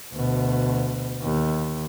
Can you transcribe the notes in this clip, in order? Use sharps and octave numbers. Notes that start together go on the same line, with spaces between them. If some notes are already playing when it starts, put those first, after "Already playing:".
D2 B2
D#2